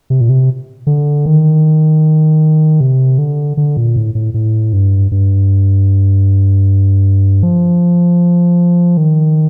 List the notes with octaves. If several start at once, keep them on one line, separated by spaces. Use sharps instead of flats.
C3
A#2
C3
D3
D#3
C3
D3
D3
A#2
A2
A2
A2
G2
G2
F3
D#3